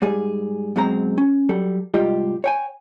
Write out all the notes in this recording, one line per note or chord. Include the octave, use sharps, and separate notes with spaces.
G#2 G3 G#4
F#2 B2 F#3 G#3 C4 A#5
C#4
F#3 G3 A4
C2 G#2 G3 F4 G4 D#5
C#5 G5 G#5